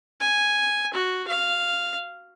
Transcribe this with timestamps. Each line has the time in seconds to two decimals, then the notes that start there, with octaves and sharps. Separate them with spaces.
0.20 G#5
0.93 F#4
1.28 F5